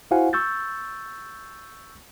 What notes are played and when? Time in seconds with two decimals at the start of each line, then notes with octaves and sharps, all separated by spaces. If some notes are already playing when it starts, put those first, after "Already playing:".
0.11 E4 F#4 C5 F5 F#5 G#5
0.33 C#6 E6 G6 A6